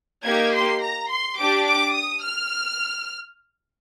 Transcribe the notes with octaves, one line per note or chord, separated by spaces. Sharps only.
A#3 D#4 G4 G#6
C6
A#5
C6
D4 G4 D6
D6
D#6
F6